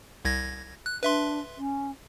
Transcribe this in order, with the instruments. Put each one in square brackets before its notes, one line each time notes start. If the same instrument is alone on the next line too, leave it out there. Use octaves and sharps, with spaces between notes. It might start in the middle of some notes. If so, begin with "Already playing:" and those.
[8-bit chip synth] C2 G#6 A#6
F#6
[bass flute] D4 [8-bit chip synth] B4 E5 C6
[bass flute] C#4